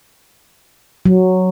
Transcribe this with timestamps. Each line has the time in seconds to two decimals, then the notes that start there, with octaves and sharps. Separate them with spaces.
1.05 F#3